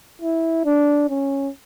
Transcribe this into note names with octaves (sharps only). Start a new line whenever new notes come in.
E4
D4
C#4